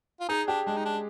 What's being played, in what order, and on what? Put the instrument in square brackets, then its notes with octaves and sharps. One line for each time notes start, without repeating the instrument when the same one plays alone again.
[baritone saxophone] F4
[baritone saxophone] D#4 [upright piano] G#4
[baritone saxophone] D4 [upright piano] G4
[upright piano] G#3 [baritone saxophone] D4
[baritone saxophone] D#4
D4